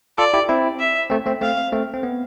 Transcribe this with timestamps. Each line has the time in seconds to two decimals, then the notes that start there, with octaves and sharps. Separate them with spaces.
0.18 F4 A4 D5
0.34 E4 G4
0.49 C4 E4
0.79 E5
1.10 A3 C4
1.26 A3 C4
1.41 A3 C4 F5
1.72 A3 C4
1.94 C4
2.03 B3